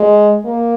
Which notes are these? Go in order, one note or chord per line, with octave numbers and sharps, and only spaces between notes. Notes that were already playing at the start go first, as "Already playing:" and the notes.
Already playing: G#3
A#3